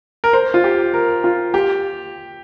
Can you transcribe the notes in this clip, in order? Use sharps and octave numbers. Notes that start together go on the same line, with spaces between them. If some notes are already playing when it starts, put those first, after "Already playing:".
A#4
C5
F4
G4
A#4
F4
G4